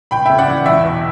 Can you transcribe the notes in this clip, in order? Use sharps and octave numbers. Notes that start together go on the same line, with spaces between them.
C#2 G5 B5
C#3 E5 G5
D5 F#5
E3
E2 E5
B2